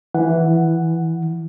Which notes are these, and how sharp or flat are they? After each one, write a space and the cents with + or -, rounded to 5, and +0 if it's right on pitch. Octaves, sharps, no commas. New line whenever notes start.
E3 +0 F#5 +0